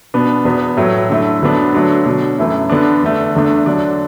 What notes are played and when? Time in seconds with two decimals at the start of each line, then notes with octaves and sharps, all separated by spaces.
0.14 B2 B3 D4
0.45 E2 B2 B3
0.77 A2 F#3 A3
1.10 D3 F#3 A3 E4
1.42 D2 D3 F#3 B3 D4
1.73 D3 F#3 A3 D4
2.05 B2 F#3 D4
2.38 F#2 E3 A3 E4
2.70 D3 B3 D4
3.02 E2 D3 A3
3.35 E2 D3 A3 D4
3.66 D3 F#3 D4